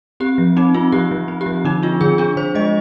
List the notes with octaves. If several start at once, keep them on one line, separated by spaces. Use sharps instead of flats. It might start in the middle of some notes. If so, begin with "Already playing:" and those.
C4 G4
F3
C4 D#4
C4 F4
F3 G4
F3
C4
G4
F3
D3 D#4
D4 F4
D3 G#4
D4 G#4
D3 C5
G#3 D#5